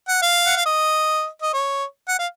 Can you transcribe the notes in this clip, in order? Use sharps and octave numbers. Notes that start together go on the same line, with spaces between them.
F#5
F5
F#5
F5
D#5
D#5
C#5
F#5
F5